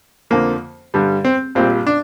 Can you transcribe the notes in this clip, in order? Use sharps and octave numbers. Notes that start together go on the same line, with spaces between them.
F2 D3 F3 A#3
G2 D3 G3
C4
A#1 A#2 G3 C4
D4